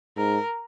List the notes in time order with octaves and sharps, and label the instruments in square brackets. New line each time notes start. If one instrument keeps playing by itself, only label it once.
[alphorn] G#2 [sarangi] A#4